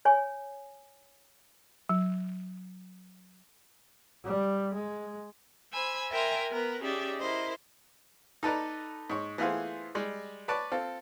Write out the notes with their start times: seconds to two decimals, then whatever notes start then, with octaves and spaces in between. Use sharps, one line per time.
0.05 C#5 G#5
1.89 F#3
4.24 G3
4.74 G#3
5.73 C5 G#5 B5 E6
6.11 A#4 E5 G5 G#5 A#5 C6
6.50 B3 A#4 B4
6.82 C#4 D#4 G4 G#4 D5 E5
7.18 E4 A#4 C5 D#5
8.43 D#4 A4 B4 D5 A#5
9.10 G#2 C#5
9.38 E3 A3 B3 F4 G#4 C5
9.95 G3 G#3
10.48 B4 C#5 D5 A5
10.72 C4 F4 A4